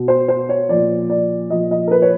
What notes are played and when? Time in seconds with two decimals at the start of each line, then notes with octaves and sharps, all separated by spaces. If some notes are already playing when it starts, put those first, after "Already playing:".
Already playing: B2
0.08 C5
0.28 C5
0.49 C#5
0.69 A#2 F3 D5
1.10 D5
1.50 A#2 F3 D#5
1.71 D#5
1.87 A#4
1.91 B4
2.02 C#5